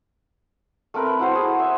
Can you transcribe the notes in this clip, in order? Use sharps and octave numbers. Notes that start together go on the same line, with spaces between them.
A3 C4 A#4 B4
B4
E4 F#4 C5
G#4
E5